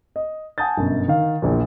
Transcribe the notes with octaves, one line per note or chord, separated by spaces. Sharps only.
D#5
F#5 G#5 A5 D#6 G6 A6
G1 F#2 B2
D#3 F5
A#1 E2 A#2